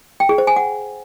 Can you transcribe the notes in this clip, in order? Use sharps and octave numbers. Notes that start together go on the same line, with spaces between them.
G5
G#4
C5
G#5
F#5